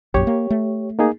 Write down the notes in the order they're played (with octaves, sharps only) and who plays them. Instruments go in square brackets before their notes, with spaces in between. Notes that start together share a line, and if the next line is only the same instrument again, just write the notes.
[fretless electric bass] A#1 F#2 [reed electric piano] G4 C#5
[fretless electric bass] A#3
A3
[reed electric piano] A#3 D#4 G#4